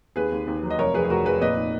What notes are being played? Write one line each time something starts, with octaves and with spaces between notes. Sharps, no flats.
D#2 G#4 B4
D#2
D#2
F#3
D#5
F1 A#4 C#5
F2 G#4 B4
G#4
F1 F#4 A#4
F2 G#4 B4
A#2 B4 D#5
D#4